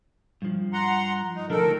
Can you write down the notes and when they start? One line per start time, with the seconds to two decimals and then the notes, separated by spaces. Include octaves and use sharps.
0.42 G2 F3
0.73 F#5 A#5 C6
1.35 D#4
1.50 D2 D#3 F3 D4 A4 A#4